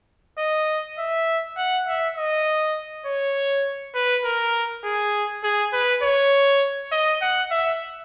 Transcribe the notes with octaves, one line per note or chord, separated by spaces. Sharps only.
D#5
E5
F#5
E5
D#5
C#5
B4
A#4
G#4
G#4
B4
C#5
D#5
F#5
E5